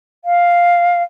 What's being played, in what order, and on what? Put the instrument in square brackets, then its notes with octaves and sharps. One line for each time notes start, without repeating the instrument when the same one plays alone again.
[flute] F5